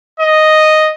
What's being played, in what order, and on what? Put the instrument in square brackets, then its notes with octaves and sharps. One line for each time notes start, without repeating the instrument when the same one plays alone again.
[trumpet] D#5